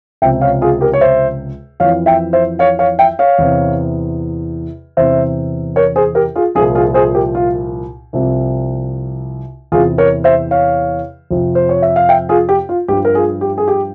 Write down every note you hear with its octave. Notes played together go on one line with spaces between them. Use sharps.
C#2 C3 F3 E5 G5
C#5 F5
F4 G#4
G4 A#4
C#5
C5 E5
F2 E3 C#5 F5
E5 G5
C5 E5
C#5 F5
C#5 F5
E5 G5
C#5 F5
E2 C3 E3
E2 C3 E3 C5 E5
A#4 C#5
G#4 C5
G4 A#4
F4 G#4
C2 A#2 F3 F4 G#4
F4 G#4
G#4 C5
G4 A#4
F4
C2 C3 F3
E2 C3 E3 F4 G#4
A#4 C#5
C5 E5
C#5 F5
F2 C3 F3
C5
C#5
E5
F5
E5 G5
F4 G#4
G4
F4
G2 F3 G4
A#4
F4 G#4
G4
G#4
G4